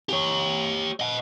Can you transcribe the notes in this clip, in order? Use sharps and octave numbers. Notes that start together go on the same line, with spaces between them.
G4 C#5
D#5 F#5